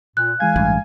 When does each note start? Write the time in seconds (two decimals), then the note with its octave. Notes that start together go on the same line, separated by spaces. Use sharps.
0.17 A#2 F#6
0.40 E3 G#3 F5 G#5 G#6
0.56 A1 G2